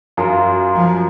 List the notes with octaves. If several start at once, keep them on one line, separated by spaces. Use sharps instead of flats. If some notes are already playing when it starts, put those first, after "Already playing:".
F#2 F4 A#4 F5
F3